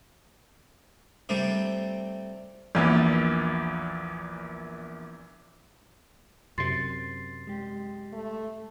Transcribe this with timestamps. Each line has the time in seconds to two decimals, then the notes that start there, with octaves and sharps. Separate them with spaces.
1.29 C3 G3 A3
2.75 A#1 E2 A#2
6.58 F#2 C3 C6 A6 C7
7.47 G#3 G4
8.13 A3